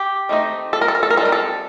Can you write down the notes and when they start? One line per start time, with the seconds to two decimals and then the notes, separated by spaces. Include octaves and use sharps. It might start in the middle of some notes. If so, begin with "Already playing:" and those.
Already playing: G4
0.29 D#3 A3 C4 D#4
0.73 A4
0.81 A#4
0.88 A4
0.95 A#4
1.03 A4
1.10 A#4
1.17 G3 C4 D#4 A4
1.25 A#4
1.32 A4